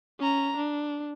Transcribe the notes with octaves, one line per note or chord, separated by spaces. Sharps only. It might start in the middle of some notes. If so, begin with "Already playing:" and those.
C#4 A#5
D4